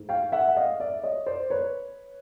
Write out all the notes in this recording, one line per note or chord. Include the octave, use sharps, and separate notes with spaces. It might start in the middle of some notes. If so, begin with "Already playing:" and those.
Already playing: G#2 E3 A3
F5 G5
E5 F#5
F#5
D#5 F5
D5 E5
C#5 D#5
C5 D5
B4 C#5